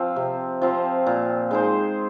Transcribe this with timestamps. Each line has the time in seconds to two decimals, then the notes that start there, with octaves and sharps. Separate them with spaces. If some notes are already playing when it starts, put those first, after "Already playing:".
Already playing: F3 C4
0.16 C3
0.62 F3 C4
1.06 A#2
1.51 G#3 D#4 C5